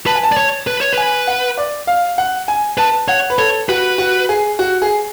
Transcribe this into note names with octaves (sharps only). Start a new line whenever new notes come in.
B4 A5
G#5
A5
D5
C#5
B4
C#5
B4 G#5
F#5
D5
F5
F#5
G#5
B4 A5
C#5 F#5
B4
A4 C#5
F#4 B4
F#4
G#4
F#4
G#4